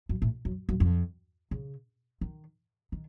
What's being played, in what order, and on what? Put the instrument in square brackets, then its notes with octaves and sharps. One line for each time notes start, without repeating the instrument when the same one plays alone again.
[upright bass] F#2
A2
F#2
F#2
F2
C#3
D#3
D#3